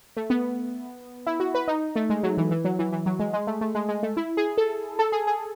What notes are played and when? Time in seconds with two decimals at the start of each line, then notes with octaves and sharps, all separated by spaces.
0.17 A3
0.30 B3
1.27 E4
1.40 F#4
1.55 B4
1.68 D#4
1.96 A3
2.10 G#3
2.23 F#3
2.38 E3
2.51 E3
2.65 F#3
2.79 E3
2.92 E3
3.06 F#3
3.19 G#3
3.33 G#3
3.47 A3
3.61 A3
3.75 G#3
3.89 G#3
4.03 A3
4.17 E4
4.37 G#4
4.58 A4
4.99 A4
5.12 G#4
5.27 G#4